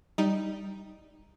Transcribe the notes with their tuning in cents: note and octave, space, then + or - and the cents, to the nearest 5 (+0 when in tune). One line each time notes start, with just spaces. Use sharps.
G3 +0 D#4 +0